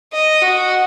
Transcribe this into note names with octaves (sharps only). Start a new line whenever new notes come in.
D#5
F#4